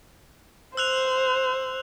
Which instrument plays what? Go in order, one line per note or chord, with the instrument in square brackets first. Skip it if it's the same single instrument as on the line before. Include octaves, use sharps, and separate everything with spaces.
[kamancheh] C5 [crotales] E6 F#6 F7